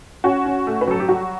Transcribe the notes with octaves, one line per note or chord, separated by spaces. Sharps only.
C#4 F#4
C#4
A3
B4
F#3 A4
G4
G3 F#4